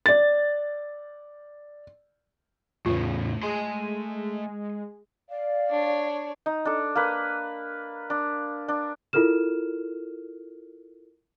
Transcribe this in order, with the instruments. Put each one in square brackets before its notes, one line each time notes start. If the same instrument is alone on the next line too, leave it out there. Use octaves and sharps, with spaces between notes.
[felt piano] D5 A6
[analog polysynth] E2 [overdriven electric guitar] A2 C#3 [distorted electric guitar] A3 C#5 [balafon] F4
[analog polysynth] G#3 [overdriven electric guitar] G#5 C6
[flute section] D5 F5
[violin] D4 C#5
[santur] D#4
D4 A4
A#3 B4
D4
D4
[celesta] E4 F4 A4 A#4 F6 E7